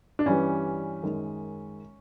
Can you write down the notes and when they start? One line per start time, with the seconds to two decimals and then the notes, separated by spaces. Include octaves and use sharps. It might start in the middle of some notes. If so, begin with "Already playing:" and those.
0.19 D4
0.26 G2 E3 G3 C#4
1.03 F#2 D#3 G#3